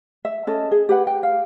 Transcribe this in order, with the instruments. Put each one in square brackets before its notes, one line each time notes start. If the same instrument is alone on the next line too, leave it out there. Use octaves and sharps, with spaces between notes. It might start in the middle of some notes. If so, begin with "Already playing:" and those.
[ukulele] E5
C#4 A4 D#5
G#4
G4 B4 F#5
G5
F5